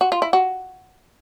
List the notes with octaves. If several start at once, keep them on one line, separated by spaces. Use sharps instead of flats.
F#4
F4
E4
F#4